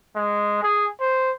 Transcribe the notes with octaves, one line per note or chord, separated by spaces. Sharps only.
G#3
G#4
C5